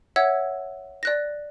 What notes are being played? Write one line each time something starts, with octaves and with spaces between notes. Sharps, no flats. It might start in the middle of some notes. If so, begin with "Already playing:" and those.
C#5 E5 F#5 E6 G#6
D5 F#6 A#6